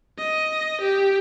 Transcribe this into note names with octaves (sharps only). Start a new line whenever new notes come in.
D#5
G4